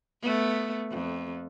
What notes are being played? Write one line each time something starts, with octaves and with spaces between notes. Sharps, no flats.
A3 B3
F2